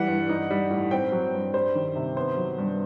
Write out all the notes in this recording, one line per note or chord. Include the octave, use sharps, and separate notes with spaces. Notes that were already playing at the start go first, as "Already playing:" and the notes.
Already playing: E3 G3 F#5
G2
D#4
G3
A2
C4 G5
F#3
G2
G3 C5
D#3
C3
B3 C5
F#3
G2